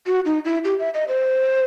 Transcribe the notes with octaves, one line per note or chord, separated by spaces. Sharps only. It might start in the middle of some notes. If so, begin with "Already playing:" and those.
F#4
D#4
E4
G4
E5
D#5
C5